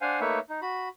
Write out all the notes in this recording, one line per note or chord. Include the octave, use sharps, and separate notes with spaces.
D4 C5 F5 F#5 G#5
A3 A#3 D#4 B4 C#5 E5
D#4
F#4 B5